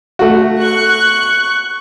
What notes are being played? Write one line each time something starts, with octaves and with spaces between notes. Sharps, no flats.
A3 F#4
C#6 F#6